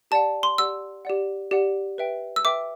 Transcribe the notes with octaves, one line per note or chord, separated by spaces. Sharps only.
G4 D5 F#5 A5
C6
G4 D5 F#5 E6
G4 D5 F#5
G4 D5 F#5
B4 E5 G5
E6
B4 E5 G5 D6